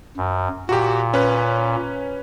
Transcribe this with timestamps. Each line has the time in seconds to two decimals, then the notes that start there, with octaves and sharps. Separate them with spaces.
0.17 F#2
0.69 A#2 F#4 G4
1.14 C#4 B4